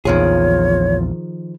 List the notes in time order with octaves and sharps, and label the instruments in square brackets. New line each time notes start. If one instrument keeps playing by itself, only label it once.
[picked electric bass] A#1 E2 [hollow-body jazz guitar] D#3 F3 G#4 [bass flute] F4 [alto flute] C#5